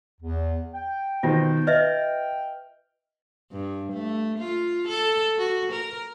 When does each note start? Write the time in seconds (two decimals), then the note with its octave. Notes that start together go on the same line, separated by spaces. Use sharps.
0.21 E2
0.74 G5
1.23 B2 D#3 F4 C5
1.67 B4 D#5 E5 F6
3.52 G2
3.92 A3
4.39 F4
4.88 A4
5.38 F#4
5.72 A#4